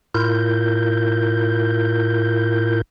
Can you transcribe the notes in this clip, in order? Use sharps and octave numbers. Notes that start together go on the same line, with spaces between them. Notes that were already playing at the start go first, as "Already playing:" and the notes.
A2 E4 F4 A#4 G6